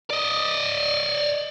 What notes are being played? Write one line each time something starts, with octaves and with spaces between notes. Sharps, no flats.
D5 D#5